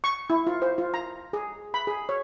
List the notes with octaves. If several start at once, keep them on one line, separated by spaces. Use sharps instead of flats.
C#6
E4
F4
C5
F4
A#5
G#4
B5
G#4
C#5